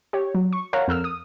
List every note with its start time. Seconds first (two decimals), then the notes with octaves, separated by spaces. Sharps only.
0.13 G4 C#5
0.34 F#3
0.53 C#6
0.73 A#4 C#5 F5 F#5 A#5
0.88 F2 A#4 E6 F6
1.04 D#6